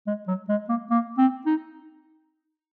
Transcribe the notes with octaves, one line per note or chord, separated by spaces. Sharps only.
G#3
F#3
G#3
A#3
A#3
C4
D#4